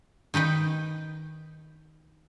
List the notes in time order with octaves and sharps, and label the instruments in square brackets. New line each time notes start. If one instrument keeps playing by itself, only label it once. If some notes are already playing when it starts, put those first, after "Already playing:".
[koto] D#3 D#4 B4 G5